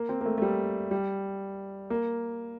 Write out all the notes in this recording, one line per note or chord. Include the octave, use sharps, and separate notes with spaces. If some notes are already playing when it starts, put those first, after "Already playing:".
Already playing: A#3
C4
A#3
A3
A3
G3
G3
A#3